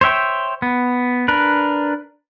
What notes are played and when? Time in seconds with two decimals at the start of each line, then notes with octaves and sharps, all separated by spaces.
0.01 C5 C#5 E5 G5
0.62 B3
1.28 D4 A#4 B4